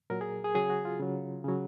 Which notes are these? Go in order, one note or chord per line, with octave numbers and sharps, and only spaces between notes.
A#2 F#3 A#4
G#4
G#4
C#3 F#3 G#4
F#4
F4
C#3 F#3
C#3 F#3